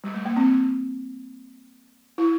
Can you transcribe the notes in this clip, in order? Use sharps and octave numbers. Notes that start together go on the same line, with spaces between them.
G3
A3
A#3
C4
E4